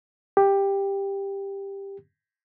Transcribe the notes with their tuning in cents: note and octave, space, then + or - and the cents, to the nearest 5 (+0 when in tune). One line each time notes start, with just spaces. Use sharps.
G4 +10